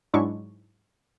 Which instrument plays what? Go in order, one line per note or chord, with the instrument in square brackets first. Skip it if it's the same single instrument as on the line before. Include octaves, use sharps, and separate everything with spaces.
[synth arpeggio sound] G#2 F#3 G#3 D4 E4 C#6